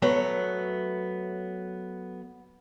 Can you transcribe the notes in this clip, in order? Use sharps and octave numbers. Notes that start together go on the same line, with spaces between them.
F#3 A3 B3